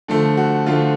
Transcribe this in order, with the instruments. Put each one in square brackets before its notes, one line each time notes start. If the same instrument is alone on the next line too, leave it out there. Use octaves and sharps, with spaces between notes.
[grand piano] D3 F3 A3
F#4
D3 F3 A3 F4